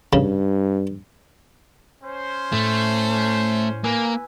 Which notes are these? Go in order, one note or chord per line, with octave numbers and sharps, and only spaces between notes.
G2 C#3
C#4 C5
A2 A3
A#3 B4 G#5 E6